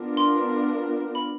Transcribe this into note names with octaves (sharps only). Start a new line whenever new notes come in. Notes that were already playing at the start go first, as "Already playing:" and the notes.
Already playing: B3 D4 F4 A#4
C6
B5